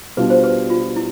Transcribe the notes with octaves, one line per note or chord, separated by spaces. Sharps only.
B2 G3 D4 F4 B4
C5
B4
F4
E4